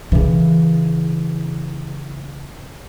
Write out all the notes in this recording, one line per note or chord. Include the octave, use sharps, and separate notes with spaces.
C#3 E3